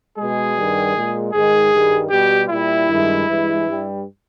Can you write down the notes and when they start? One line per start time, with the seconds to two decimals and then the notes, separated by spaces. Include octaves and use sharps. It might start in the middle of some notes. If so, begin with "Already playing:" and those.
0.17 B2 G#3 G#4
0.56 G2 D#3 G3
0.95 A#2 G#3
1.33 G#2 D#3 G#3 G#4
1.72 G2 D#3 G3
2.10 B2 G3 G4
2.49 A#2 G3 E4
2.88 G2 D#3 G#3
3.27 G2 E3 G#3
3.65 G2 G3